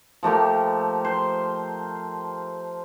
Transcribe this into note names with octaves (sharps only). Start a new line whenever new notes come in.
F3 A3 A#3 G4
C5